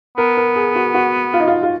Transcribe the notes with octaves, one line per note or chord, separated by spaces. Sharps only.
B3 A#4
A#4
G#4
F#4
F#4
F4
D#4
F4
F4